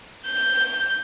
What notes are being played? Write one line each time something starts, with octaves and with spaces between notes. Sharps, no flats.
G6